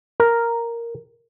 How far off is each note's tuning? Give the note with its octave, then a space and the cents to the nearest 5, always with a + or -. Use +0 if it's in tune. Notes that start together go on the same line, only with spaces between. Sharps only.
A#4 +0